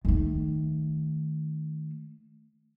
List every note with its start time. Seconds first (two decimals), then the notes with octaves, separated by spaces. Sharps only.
0.05 D#3 A3